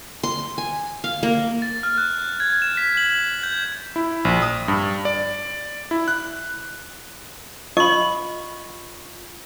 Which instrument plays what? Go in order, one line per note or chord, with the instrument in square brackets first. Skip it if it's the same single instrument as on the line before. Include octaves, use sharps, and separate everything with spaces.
[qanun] C6
G#5
F5
A#3
[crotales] A6
F6
F#6
G#6
E7
B6
F#7
G6
[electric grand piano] E4
A#1
D#6
G2
D5
E4
F#6
[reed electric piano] F4 [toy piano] D#5 [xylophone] B5 C#6